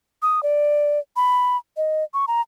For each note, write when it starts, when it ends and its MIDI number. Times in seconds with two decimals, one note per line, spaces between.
0.22 0.42 87
0.43 0.99 74
1.16 1.57 83
1.77 2.04 75
2.14 2.25 85
2.28 2.41 82